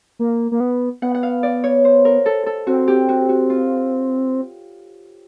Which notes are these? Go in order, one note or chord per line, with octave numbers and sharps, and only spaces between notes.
A#3
A#3
B3
B3 F#5
F#5
F5
D5
C#5
C5
A#4
A4
A4
C4 F#4
G4
F#4
F#4
F4